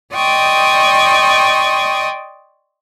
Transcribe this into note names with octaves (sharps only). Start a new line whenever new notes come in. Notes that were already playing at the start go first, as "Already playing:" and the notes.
D5 D#5 G5 C6 C#6 D#6